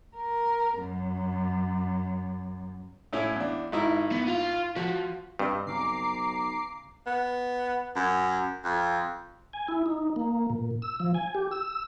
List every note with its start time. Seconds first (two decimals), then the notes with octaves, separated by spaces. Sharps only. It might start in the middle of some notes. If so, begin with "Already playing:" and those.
0.16 A#4
0.80 F#2
3.13 A2 C#4 E4
3.36 E2 D4
3.72 G#1 D#4 E4
4.12 B3
4.28 F4 F5
4.76 F3 F#4
5.39 G2 C4 D#5 F6
5.67 B1 C#3 A#5 D6 C7
7.06 B3
7.96 F#2
8.64 F2
9.53 G#5
9.68 E4
9.86 D#4
10.16 A#3
10.50 A#2
10.82 E6
11.00 F3
11.14 G#5
11.35 G4
11.52 E6